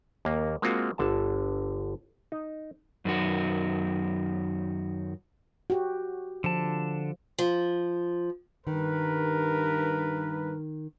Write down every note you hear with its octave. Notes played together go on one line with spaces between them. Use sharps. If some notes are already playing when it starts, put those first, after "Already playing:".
D#2 A#3
G#3 A#3 C4 F4 F#4
G1 D3 A5
D#4
F#2 D#3 F#4
F#4 G4
D3 F3 A5
F3
G2 D#3 A#4 B4